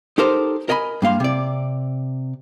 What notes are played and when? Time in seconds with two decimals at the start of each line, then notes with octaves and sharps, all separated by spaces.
0.18 D#4 G4 A4 A#4 C5
0.69 A#4 D#5 G#5 B5
1.02 G2 A#3 F5 C6
1.20 C3 D5